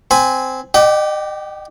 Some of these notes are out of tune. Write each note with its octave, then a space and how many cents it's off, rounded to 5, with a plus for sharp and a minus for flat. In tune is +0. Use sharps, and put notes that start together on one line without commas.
C4 -10 G#5 +0 B5 +15
G4 +0 D#5 -35 G5 -45